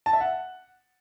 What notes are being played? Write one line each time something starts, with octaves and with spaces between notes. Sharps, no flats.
A5
E5
F#5